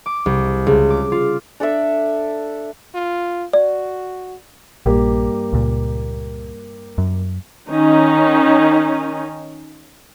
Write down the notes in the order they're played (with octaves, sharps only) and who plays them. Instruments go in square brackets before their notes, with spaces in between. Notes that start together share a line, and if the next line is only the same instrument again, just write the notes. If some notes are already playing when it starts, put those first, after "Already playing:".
[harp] D6
C2
C#2
D6
F4
[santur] D4 A4 D5 E5
[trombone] F4
[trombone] F#4 [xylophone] D5
[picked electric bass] A#1 [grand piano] G2 A#3 G4
[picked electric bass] C#2 A#2
F#2
[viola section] D#3 C#4 D#4